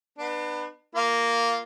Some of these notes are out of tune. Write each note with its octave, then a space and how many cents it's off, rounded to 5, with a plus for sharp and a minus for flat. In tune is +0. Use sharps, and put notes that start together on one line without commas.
B3 +0 D4 +40
A#3 -5 F4 +0